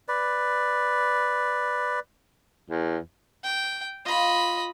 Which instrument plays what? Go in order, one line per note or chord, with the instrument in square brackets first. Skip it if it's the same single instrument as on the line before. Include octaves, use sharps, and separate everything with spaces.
[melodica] B4 D5
[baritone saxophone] E2
[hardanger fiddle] G5
[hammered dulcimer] F4 [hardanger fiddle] D#5 B5